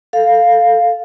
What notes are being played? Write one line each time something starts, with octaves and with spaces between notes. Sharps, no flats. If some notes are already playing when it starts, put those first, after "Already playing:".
A4 F5